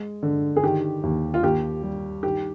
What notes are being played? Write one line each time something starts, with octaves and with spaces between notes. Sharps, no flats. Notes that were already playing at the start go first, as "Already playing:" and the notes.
Already playing: G#3
D3
G#4
D#3 G4
D#2
F4
D#2 G4
G3
D#3 G4